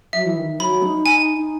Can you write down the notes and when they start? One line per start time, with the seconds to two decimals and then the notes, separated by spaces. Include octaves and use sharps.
0.13 F#3 E5
0.26 E3
0.37 D#3
0.59 F#3 B5
0.82 D#4
1.06 D#4 G#5
1.37 D#4